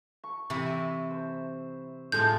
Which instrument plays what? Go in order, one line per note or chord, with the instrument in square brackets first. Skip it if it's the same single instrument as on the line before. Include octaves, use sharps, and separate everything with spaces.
[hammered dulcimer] C#6
[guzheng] C3 E3 E4 [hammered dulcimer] E5 C#6
[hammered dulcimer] C5
[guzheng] A2 G#3 F4 [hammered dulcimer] A4 [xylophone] G6